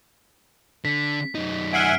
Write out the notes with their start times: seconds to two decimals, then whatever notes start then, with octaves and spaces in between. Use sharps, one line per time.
0.85 D3 B6
1.35 F#2 D#4
1.73 E5 F#5 G#5 F6 C7 D7